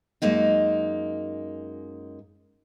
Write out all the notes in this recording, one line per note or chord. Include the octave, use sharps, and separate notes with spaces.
F#2 G#3 A#3 D#4